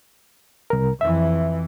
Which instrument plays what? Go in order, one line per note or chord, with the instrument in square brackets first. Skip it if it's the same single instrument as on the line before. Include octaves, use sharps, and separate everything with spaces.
[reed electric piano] C2 A#4
[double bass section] F2 E3 [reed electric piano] E5